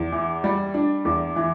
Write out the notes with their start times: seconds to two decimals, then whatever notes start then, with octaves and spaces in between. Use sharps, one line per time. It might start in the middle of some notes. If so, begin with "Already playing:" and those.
Already playing: E2
0.12 E3
0.44 G3
0.74 D4
1.05 E2
1.36 E3